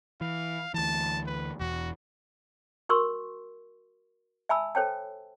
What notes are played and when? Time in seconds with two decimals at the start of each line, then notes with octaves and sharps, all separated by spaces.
0.21 E3 F5
0.74 D2 E3 A5
1.27 B4
1.60 E1 E2 F#4
2.89 F#4 A#4 C6 C#6 E6
4.49 E5 G#5 A5 B5 E6
4.75 A4 C5 C#5 G5 A5